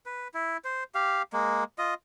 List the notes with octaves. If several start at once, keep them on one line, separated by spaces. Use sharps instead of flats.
B4
E4
C5
G4 F5
G#3 A#3
F4 D#5